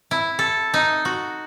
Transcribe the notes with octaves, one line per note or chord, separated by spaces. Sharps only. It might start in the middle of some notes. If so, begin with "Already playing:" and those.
E4
A4
D#4
F#4